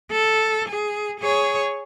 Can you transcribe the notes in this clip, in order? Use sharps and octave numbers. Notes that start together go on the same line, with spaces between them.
A4
G#4
G#4 C#5